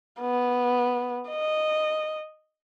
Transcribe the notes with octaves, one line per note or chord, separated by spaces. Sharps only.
B3
D#5